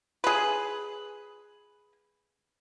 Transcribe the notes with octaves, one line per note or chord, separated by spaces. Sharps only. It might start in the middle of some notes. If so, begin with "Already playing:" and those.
G#4 B4